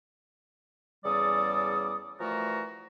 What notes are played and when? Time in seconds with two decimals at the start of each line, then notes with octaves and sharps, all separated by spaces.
1.05 E2 C#3 G3 A4 D5 D#6
2.20 E3 F3 A3 F#4 A#4 D5